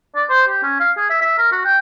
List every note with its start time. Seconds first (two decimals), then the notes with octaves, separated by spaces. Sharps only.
0.16 D5
0.30 C5
0.47 G4
0.63 C#4
0.80 F5
0.97 G#4
1.10 E5
1.21 E5
1.38 A#4
1.52 F#4
1.65 G5